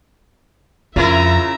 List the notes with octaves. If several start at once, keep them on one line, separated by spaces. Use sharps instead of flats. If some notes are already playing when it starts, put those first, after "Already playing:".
F2 C#3 E4 F4 A#4 E5 A#5